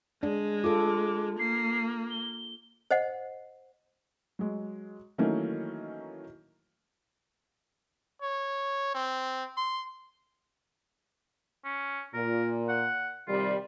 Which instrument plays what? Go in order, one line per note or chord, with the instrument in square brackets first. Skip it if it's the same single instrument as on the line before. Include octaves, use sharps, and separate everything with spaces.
[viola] G#3 [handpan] D4
[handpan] F4 A4 [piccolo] D6
[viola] A#3 [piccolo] C7
[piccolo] G7
[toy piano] C5 D#5 F#5
[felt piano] F#3 G#3
D#3 E3 F#3 A3 A#3 C#4
[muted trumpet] C#5
C4
C6
[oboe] C#4
[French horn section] A#2 [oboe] A#4
[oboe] F#5
[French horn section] C3 D#3 G3 [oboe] F4